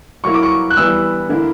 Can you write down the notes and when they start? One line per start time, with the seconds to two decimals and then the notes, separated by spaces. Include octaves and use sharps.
0.24 F#3 A#3 E4 C#6
0.34 D6
0.43 C#6
0.70 F#6
0.76 E3 G3 B3 E4 E6
1.29 D3 A#3 E4